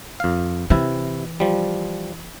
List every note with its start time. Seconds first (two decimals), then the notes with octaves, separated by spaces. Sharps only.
0.20 F2 F5
0.70 C3 E3 E4
1.40 F3 G3